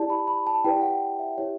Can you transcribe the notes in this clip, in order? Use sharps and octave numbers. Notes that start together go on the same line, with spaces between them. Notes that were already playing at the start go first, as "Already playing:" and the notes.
Already playing: E4 G4 D5 A5
B5
B5
A5
E4 G4 B4 D5 G5
F#5
E5
E4 G4 C#5